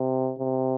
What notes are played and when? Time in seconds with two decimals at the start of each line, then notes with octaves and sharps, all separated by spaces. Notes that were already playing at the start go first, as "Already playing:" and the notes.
Already playing: C3
0.39 C3